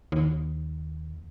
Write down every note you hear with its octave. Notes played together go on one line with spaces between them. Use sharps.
D#2